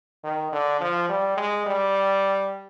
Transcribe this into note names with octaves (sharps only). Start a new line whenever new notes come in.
D#3
D3
F3
G3
G#3
G3